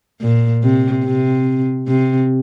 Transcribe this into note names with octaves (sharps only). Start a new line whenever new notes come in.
A#2
C3
C3
C3